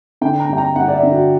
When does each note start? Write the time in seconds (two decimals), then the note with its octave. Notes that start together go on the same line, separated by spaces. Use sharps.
0.21 D3 G5
0.39 A#5
0.49 G2 G5
0.58 A#5
0.76 G2 F#5
0.88 D5
0.94 E5
1.03 D3
1.12 F#4